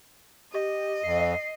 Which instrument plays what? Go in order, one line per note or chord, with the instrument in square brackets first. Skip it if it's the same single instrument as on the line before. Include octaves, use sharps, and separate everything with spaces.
[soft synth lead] G4 [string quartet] D#5
[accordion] F2 [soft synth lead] C7